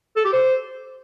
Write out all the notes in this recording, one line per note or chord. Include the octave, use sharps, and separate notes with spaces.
A4
G4
C5